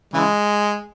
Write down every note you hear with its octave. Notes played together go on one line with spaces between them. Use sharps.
C#3 E3 G#3